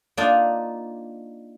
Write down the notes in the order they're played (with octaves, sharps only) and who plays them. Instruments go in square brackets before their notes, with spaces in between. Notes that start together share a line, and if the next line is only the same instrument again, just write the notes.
[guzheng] A#3 D4 D#4 F4